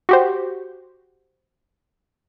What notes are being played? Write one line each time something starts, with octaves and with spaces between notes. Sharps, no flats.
F#4 G4 C5